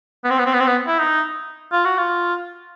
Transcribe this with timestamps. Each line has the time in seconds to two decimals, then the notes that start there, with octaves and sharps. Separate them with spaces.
0.24 B3
0.30 C4
0.38 B3
0.46 C4
0.53 B3
0.60 C4
0.67 B3
0.87 E4
0.99 D#4
1.72 F4
1.85 F#4
1.98 F4